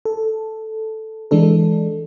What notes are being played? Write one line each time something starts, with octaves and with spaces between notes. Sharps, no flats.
A4
E3 G#3 D4 A4